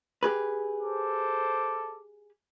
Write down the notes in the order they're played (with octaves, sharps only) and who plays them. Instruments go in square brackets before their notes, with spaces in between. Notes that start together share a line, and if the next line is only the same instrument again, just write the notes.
[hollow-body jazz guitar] G4 G#4 B4
[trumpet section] A4 C5 D6